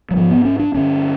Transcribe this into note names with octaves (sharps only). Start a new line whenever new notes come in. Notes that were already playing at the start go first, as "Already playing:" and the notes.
F#3
G#2 F3
B3
C#4
D4
G2 D3 C#4